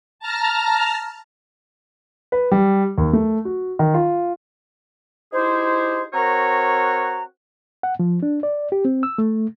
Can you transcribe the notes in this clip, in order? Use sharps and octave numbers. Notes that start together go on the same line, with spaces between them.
A5 A#5 F6
B4
G3
D#2
A3
F#4
D#3
F4
D#4 E4 G4 G#4 C5
C4 F#4 A#4 C#5 F#5 A#5
F#5
F3
D4
D5
G4
C4
E6
A3